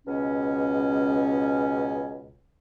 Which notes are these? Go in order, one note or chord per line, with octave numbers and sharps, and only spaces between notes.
C#2 B2 C#4